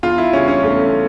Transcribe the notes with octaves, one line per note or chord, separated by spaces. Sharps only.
E2 F4
E4
C#3 G3 C#4
C#4
E2 A3